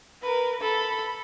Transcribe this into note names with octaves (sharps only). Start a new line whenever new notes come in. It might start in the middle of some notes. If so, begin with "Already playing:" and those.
A#4 B4
A4 B5